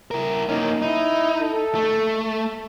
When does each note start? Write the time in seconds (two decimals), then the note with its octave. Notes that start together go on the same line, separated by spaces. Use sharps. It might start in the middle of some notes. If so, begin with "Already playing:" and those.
0.11 E4 A#4
0.49 A#3 C#4 D#4
0.82 D#4 E4
1.42 A4
1.75 A3